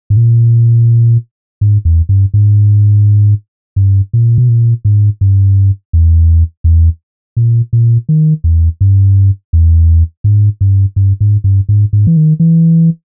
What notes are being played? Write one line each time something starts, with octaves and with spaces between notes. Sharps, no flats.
G#2
A#2
G#2
E2
G2
G#2
G2
A#2
B2
A#2
G#2
G2
E2
E2
A#2
A#2
D#3
E2
G2
E2
G#2
G2
G2
G#2
G2
G#2
G#2
E3
D#3
E3